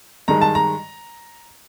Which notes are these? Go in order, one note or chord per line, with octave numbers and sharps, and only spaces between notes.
G2 D#3 G#3 A#5
A5
A#5